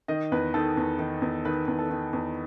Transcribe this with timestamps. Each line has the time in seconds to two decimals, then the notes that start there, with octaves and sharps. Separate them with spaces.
0.08 D#3 D#5
0.32 E2 B4
0.54 D#3 A4
0.77 E2
0.99 D#3
1.22 E2
1.45 D#3 B4
1.68 E2
1.79 A4
1.90 D#3
2.13 E2